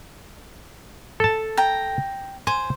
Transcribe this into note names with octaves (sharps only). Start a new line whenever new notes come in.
A4 A5
G5 A#5
C5 G#5